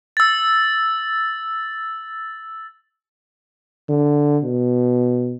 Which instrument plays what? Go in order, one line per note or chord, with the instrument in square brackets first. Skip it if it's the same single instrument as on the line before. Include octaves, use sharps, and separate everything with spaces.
[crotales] E6 A6
[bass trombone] D3
B2